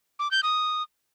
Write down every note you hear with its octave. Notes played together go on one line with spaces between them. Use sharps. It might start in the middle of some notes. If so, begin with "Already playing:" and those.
D6
G6
D#6